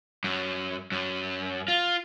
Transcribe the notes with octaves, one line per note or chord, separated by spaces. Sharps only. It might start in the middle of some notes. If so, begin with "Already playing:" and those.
F#2
F#2
F4